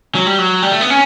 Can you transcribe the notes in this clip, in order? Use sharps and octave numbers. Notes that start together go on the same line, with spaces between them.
F#3
G3
F#3
G3
A3
B3
C#4